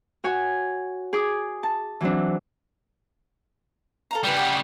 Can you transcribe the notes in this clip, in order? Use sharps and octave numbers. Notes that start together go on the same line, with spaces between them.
F#4 C#5 G#5
G#4 D6 D#6
A5
E3 F#3 C4 D4
A4 F5 A#5
C#3 G3 G4 B4 D5
G4 F#5